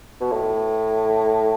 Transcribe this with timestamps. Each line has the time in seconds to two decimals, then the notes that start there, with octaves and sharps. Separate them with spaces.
0.21 B2
0.31 A2